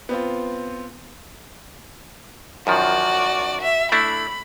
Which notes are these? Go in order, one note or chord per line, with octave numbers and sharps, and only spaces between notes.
B3 C4 F4
F#2 D#3 F3 F#4 D5
E5
A3 D4 E4 B5